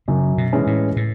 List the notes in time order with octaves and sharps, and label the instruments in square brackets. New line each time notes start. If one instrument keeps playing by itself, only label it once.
[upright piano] F#2 [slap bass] C#3
[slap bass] B2
[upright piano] E3 G#3 C#4
[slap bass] A2
A2